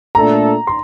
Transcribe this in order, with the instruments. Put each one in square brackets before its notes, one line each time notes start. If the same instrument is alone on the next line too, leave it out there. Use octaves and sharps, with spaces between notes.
[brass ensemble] A#2 A3 D4 A4 [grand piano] A#5
[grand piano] C6